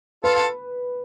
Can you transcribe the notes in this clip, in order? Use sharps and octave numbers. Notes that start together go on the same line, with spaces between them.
F4 A4 B4
A4